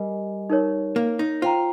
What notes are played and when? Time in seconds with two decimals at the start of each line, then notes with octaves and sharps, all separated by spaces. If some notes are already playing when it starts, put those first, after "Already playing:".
Already playing: G3 A#4 D#5 G#5
0.50 D#4 A#4 C#5
0.96 A#3
1.19 D#4
1.42 F4 C5 G5 A#5